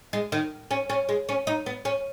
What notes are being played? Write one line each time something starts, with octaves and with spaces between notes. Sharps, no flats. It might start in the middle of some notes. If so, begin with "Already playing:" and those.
G#3
D#3
C#4
C#4
G#3
C#4
D#4
B3
C#4